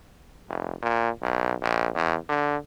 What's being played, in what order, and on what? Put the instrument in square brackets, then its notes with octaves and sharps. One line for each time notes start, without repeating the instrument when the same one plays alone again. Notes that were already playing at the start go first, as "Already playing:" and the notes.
[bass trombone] F1
A#2
B1
A#1
E2
D3